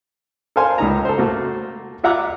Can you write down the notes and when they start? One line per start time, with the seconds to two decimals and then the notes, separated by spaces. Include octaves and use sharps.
0.56 A4 A#4 C5 F5 G#5 C6
0.78 C#2 D#4 A#5
1.05 A4 C5
1.18 A3 A#3 F#4
2.04 F4 E5 F#5 A#5 D6 F#6